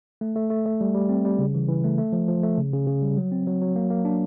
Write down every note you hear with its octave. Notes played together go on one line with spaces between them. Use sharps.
A3
A3
A3
A3
G3
G3
C4
G3
C#3
E3
E3
A3
A3
F3
F3
A3
C#3
C#3
C#3
G3
F#3
C4
F#3
F#3
A#3
A#3
D4